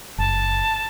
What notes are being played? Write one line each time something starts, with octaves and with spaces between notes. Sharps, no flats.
F#1 A5